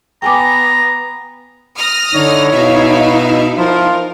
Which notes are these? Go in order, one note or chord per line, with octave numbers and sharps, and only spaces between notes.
B3 G5 G#5 A#5 D6
D#6 F6 A#6
D3 D#4 E4 C#5
B2 E5 F5
F3 F4 A#4